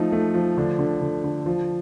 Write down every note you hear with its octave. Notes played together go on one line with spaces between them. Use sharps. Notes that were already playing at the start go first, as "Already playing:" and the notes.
Already playing: F3 A3 D#4
A3
F3
D3 D4
D3
D3
D3
F3